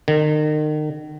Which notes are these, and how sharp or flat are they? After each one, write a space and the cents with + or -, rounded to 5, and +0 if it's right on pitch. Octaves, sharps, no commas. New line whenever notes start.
D#3 -35